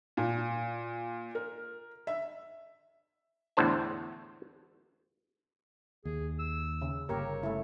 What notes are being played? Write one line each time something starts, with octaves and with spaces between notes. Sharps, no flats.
A#2
A#4
E5
E2 A2 D3 C5 A5
D#2 G#4
E6
C#3
G1 C#3 A#3 G4 A#4 C#5
A3 E4